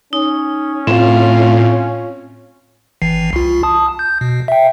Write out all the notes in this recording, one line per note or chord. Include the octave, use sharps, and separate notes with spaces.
C#4 D#4
A2 C4 F4
G#1 E3 C7
C2 F4
A5 D#6
G6
B2
E5 G5